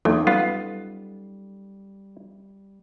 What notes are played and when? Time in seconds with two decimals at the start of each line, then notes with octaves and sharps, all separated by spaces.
0.05 E2 F#3 A#3 C#4 D#4 A4
0.27 G3 B3 F4